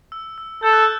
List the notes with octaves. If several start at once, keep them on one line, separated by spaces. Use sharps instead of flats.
E6
E6
A4 G6
F#6
E6